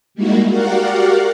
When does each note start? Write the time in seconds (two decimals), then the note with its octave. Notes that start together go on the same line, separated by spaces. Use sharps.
0.15 G3 G#3 A#3 D#4 E4 F#4
0.49 F#4 G4 A#4 D5 F5 F#5